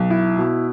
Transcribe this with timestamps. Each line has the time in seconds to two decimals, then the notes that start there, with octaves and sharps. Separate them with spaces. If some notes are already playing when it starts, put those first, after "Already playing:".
Already playing: B1
0.10 E4
0.37 B2